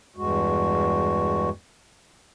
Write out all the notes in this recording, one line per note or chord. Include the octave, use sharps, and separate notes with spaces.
E2 G2 G#3 F#4